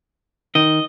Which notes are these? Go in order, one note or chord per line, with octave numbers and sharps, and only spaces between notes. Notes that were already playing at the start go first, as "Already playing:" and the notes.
D#3 D#5